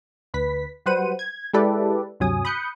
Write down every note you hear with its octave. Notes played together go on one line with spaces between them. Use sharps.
D2 B4 B6
F#3 G3 B4 C5 F#5 D#7
G#6
G#3 E4 G4 A4 B4 D5
D2 G2 C3 F#3 G#5 D#6
B5 D#6 F#6 G6 C#7